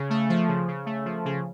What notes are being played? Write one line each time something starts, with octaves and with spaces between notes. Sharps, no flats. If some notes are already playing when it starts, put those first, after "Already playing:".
Already playing: C#3
A3
F3
C#3
C#3
A3
F3
C#3